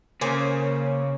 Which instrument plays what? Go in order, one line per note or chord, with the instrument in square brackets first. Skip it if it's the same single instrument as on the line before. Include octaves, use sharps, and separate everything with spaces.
[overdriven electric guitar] C#3 [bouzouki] A#3 C5 G#5 [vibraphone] C#5